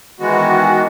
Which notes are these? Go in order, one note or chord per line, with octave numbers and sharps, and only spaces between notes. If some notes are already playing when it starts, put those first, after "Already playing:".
D#3 E3 G#3 B3 F#4